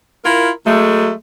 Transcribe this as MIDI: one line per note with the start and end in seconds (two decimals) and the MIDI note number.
0.24 0.50 64
0.24 0.50 65
0.24 0.50 70
0.65 1.11 54
0.65 1.11 56
0.65 1.11 57